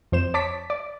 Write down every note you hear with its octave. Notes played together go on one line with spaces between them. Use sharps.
F2 C5 E7
C#5 A5 D6 B6
D5